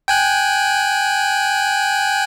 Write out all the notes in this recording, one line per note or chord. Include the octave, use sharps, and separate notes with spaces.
G5 G#5 F#6